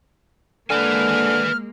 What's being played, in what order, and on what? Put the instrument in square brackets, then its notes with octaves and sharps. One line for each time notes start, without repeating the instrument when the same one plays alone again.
[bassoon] D3 [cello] G#3 A#3 [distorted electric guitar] B4 G#5 [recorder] F6